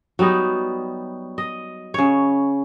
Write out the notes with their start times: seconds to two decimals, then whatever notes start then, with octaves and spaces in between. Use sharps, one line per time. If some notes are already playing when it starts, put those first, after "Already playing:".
0.19 F#3 G3 B3 D#4
1.38 D#5
1.94 C#3 C#5